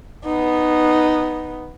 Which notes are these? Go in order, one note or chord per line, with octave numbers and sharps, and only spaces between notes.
B3 D#4